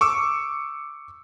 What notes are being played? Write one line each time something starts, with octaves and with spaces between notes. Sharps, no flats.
C#6 D6 E6